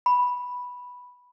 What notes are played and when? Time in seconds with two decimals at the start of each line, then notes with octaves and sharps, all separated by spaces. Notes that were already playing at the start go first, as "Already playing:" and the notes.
0.06 B5